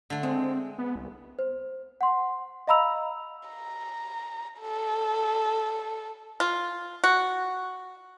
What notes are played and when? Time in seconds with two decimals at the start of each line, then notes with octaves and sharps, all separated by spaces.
0.10 D3 A3
0.23 G#3 C4
0.79 B3
0.96 C2
1.39 C5
2.01 F#5 C6
2.68 D#5 F5 A#5 B5 E6 F7
3.49 A#5
4.60 A4
6.40 F4
7.04 F#4